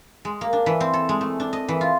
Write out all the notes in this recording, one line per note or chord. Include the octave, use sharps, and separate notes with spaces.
G#3
A#3
D4
E3
C4
A4
G#3
A3
D4
D#5
E3
F4